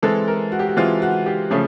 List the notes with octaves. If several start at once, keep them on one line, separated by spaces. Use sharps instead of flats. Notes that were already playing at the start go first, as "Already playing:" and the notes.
E3 G#3 C4 A4
A#4
F#4
G4
F#4
E3 G#3 C4 F4
F#4
G4
C#3 F3 A3 C#4 G#4